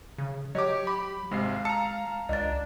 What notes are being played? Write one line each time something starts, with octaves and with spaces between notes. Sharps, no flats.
C#3
F#3 G4 C#5 D#5 D6
B5 D6
G#1 C3 G#3 F5 C7
A5 A#5 E6 C#7
C#2 D4 D#5 A6